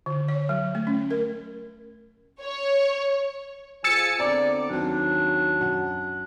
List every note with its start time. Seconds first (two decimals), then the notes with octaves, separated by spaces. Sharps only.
0.06 D3
0.28 C#5
0.49 F#3
0.75 A3
0.87 C#4
1.11 A#4
2.41 C#5
3.84 F3 G#4 G#5 E6 A6 C#7
4.20 D3 B3 C4 D5 A#5 D6
4.70 D#2 F#3 C4 D4
5.61 F#2 F#5